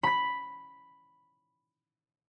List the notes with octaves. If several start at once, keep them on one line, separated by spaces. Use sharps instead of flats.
B5 B6